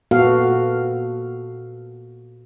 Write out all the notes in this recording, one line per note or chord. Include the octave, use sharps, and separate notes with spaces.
A#2 B3 F#4 A4 F5